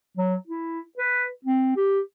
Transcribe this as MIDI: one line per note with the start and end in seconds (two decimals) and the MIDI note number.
0.17 0.36 54
0.47 0.81 64
0.98 1.27 71
1.45 1.73 60
1.76 2.00 67